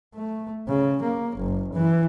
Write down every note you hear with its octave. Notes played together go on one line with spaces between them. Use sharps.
A3
C#3
A#3
F#1
E3